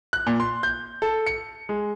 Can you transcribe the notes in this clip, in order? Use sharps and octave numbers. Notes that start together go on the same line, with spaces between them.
F#6
A#2
C6
G6
A4
C#7
G#3